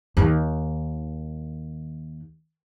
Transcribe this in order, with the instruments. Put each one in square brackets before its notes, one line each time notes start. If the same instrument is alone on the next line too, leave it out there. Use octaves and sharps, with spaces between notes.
[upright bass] D#2 D#3